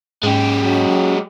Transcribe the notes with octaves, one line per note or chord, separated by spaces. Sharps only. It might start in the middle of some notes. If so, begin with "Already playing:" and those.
G#2 G#3 C#4 G4
F#3